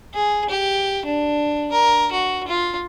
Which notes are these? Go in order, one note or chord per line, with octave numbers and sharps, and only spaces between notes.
G#4
G4
D4
A#4
F#4
F4